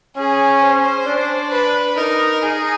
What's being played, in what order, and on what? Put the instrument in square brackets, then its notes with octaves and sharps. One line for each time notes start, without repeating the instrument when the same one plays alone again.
[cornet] C#4 [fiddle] G#4
[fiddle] C5
[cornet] D4
[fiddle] B4
[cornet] D#4 [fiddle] A#4
[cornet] D#4 [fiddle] G#4